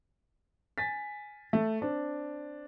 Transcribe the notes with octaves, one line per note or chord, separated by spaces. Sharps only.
G#5 A6 B6
A3
C4 D4